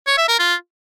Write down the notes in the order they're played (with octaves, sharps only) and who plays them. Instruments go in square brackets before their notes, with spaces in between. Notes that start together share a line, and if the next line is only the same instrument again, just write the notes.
[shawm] C#5
E5
A#4
F4